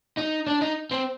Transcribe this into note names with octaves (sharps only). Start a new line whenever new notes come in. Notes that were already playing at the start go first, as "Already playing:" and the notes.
D#4
D4
D#4
C4